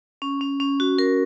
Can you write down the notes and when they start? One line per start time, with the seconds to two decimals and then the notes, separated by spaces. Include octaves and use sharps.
0.22 C#4
0.41 C#4
0.60 C#4
0.80 F#4
0.98 A#4